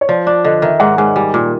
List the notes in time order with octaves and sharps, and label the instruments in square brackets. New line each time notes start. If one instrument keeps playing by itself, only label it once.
[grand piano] C#5
[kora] F3 [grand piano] D5
[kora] D4 [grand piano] D5
[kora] D3 [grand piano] D#5
[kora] D#3 [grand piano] E5
[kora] G#2 [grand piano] F#5
[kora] G#2 [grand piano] G#5
[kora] G3 [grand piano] G#5
[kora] A#2